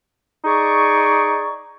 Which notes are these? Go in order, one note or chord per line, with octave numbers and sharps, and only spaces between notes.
D#4 G#4 D5 C#6